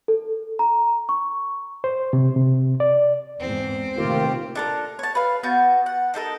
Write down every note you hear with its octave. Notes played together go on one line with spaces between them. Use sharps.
A4
A#5
C#6
C5
C3
C3
D5
E2 G#2 C4
C3 D#3 A3 A#3 F4 G4
D4 A4 A#4
C#5 A5
B4 F5
B3 F#4 A5 G6
F#5
D4 D#4 A4 A#4